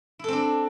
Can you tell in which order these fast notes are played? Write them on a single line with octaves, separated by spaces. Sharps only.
E4 A4 C4 D4